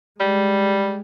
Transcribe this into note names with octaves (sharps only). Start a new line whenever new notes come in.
G3 G#3